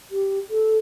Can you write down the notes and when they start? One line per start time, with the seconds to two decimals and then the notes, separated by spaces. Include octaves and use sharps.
0.11 G4
0.50 A4